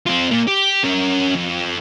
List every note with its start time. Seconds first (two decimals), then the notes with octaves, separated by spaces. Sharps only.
0.07 C4 F4
0.31 A#2 A#3
0.48 G4
0.84 C#4 A#4
1.36 F2